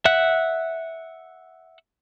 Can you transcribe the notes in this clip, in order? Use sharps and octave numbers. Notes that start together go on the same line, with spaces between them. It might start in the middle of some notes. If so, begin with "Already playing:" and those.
E5 F#5 F#6